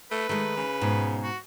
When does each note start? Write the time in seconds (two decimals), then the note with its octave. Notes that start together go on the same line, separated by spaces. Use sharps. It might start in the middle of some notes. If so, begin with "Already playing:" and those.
0.11 A3 B4
0.29 D#3 G#3 A3
0.56 C#3
0.81 G#2 B2
1.23 F#4